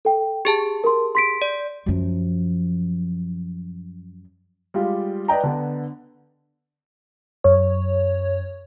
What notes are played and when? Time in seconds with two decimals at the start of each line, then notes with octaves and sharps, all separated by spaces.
0.05 A4 G5
0.45 G4 G#4 A5 C#6
0.84 A#4 C6
1.15 C6 B6 D7
1.42 D5
1.86 F#2 F3
4.74 G3 G#3 F4 G4 F5
5.28 B4 D5 D#5 G5 A#5
5.43 D3 B3 D4
7.44 F#2 C#5